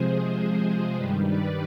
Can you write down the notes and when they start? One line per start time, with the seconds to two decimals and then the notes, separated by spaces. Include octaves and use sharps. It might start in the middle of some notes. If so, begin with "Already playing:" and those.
Already playing: C3 F3 G#3 G#4 C5
0.34 G#4 C5
0.95 G2 D#3 G3 G4 B4
1.27 B4 D5